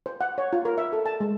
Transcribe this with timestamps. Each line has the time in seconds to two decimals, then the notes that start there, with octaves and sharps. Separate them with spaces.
0.06 C5
0.21 F#5
0.38 C#5
0.53 F4
0.65 A#4
0.78 E5
0.93 A4
1.06 A5
1.20 G#3